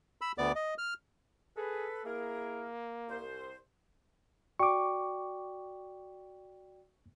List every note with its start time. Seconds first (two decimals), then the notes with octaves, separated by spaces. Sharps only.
0.21 B5 E6
0.38 D2 B3 D5 D6
0.56 D#5
0.78 F6
1.57 G#4 A4 B4
2.05 A#3 E4 G#4 A#4
3.09 C2 C5
4.59 F#4 D5 G5 C#6 D6